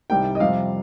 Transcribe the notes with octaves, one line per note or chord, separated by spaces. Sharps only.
C2 C3 D#3 G3 G5
D#5
F2 C3 G3 F5